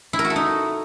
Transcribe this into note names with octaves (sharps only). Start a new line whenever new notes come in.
E4
A#4
F#4
A4
D#4